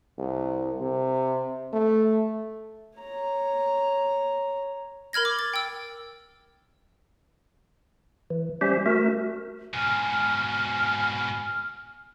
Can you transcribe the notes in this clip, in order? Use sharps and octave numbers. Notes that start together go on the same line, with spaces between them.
C2
C3
A3
C#5 A#5
A#4 B5 F6 G#6 A#6
D6
A6
G5 E6
E3
G3 C#4 G4 C5 E5
A3 F#4 A#4 E5
G#2 B2 G#5 F6